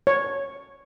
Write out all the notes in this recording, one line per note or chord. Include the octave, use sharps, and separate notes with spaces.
C#5